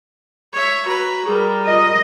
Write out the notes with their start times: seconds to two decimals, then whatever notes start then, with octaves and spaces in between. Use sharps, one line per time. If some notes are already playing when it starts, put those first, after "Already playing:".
0.53 C#5 E5
0.86 F#4 B4 A#5
1.26 G3 G#4 A#4
1.66 F4 D#5